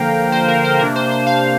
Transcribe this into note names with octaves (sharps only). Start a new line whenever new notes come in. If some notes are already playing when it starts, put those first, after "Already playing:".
Already playing: D3 F3 A#3 F5 G5 A#5
C5
A#4
C5
C3 A#3 D4 A#4
C5
C5
F5